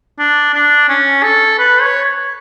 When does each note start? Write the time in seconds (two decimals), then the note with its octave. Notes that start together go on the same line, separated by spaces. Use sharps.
0.19 D4
0.54 D4
0.89 C#4
1.24 A4
1.59 B4
1.82 C#5